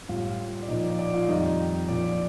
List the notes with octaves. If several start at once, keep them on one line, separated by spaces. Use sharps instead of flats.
A2 G3 F4 F5
D5
A#2 F3 D#4 D#5
D5
D5
F4 F5
F2 D#3 G3 D#4 D#5
A#2 F3 D5
D5